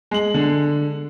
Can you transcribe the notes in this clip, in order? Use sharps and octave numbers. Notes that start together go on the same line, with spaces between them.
G#3 F#7
D3